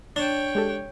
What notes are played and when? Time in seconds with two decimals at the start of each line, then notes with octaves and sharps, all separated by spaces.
0.16 D4 C#5 G5 A6 E7
0.55 G#3 G4 A4